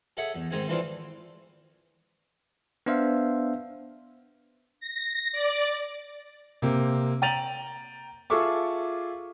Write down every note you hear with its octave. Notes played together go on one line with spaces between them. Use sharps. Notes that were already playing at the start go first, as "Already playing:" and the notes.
G#4 A4 C#5 E5 F#5
E2
G#2 D#3 C4 G#4 G#5
E3 A3 C4 D4 F4
B3 D4 C5 E5 F5
A#6
D5
C3 A#3 C4
G5 A#5 A6 D#7 F7 F#7
F4 G#4 A4 E5 C#6 D6